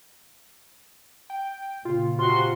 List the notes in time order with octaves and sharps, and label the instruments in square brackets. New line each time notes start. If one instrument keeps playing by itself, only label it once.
[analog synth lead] G5
[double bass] A#2 C#3 [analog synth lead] F4
[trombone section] C3 F#4 [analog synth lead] F4 [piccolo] C6